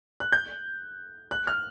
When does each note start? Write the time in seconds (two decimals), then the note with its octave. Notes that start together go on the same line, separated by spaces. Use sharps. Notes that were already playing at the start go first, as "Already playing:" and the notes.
0.20 F#6
0.32 G6
1.31 F#6
1.47 F6